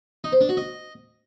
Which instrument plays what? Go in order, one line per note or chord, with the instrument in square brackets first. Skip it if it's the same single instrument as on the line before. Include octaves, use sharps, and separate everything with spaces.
[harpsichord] D#4
C5
D4
F#4
D#5